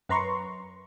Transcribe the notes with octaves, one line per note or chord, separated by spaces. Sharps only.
F#2 B4 A#5 C6 C#6